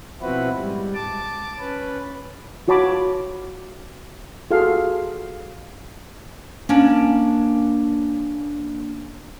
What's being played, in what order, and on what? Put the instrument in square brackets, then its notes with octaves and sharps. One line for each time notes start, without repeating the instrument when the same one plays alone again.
[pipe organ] B2 F3 C4 E4 F#4 B4
G#2 G3
A5 D6
C#4 B4
[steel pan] F4 F#4 C#5 A5 B5 D6
F4 F#4 G#4 A4 F5
[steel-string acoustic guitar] A#3 C#4 D4